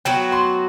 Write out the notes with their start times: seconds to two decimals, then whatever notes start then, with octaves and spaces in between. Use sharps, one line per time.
0.05 F#3 B3 F#4 G5
0.32 C6